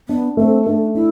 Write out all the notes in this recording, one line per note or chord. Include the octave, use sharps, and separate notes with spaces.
B3 D4
A3 C4
A3 D4
D4 E4